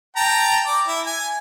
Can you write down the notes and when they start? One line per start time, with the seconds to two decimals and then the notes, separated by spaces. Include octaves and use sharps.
0.16 G5 A5 A#5
0.67 D5
0.88 E4
1.07 G#5